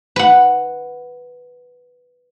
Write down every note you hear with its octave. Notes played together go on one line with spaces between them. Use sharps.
B4 F#5